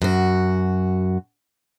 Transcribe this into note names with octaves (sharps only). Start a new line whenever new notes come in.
F#2 F#4